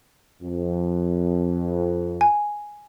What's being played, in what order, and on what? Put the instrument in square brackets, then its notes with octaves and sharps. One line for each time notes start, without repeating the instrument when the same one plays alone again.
[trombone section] F2
[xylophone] G#5